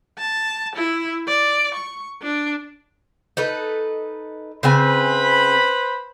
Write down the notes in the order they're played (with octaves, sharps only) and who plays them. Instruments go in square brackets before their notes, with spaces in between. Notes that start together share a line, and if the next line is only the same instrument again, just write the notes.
[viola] A5
E4
D5
C#6
D4
[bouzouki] D#4 A4 B4
[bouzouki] C#3 C4 G#5 [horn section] B4 C5 B5